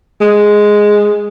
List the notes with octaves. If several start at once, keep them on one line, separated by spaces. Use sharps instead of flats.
G#3